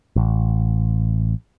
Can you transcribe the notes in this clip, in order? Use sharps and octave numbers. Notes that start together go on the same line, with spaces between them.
A1